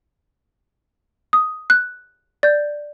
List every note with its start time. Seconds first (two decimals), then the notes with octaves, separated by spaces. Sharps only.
1.33 D#6
1.70 F#6
2.43 D5 G6